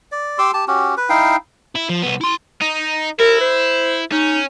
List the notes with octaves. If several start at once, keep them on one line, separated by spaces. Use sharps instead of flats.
D5
G4 C6 D6 E6
G4 A5
C#4 F#4 G4
B4
D#4 E4 F5 G5
E4
F3
C2 B3
E4 C6
D#4
E4 A#4
C5
C#4 D#4